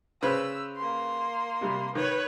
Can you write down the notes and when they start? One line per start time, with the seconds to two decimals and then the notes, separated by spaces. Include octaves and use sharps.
0.22 C#3 B4 C5 E6
0.77 A#3 C6
1.61 C3 G3
1.95 D#3 B4 C#5